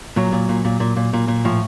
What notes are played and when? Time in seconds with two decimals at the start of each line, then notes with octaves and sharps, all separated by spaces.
0.16 A#2 F#3
0.32 A#2
0.49 A#2
0.65 A#2
0.80 A#2
0.96 A#2
1.13 A#2
1.28 A#2
1.45 A2 F3